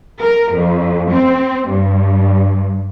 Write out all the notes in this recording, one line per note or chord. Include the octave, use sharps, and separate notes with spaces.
A#4
F2
C4
G2